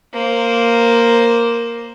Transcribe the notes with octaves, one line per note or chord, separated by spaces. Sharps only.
A#3 C5